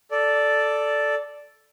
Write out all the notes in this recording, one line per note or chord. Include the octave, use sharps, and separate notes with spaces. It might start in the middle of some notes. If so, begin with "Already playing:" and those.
A4 D5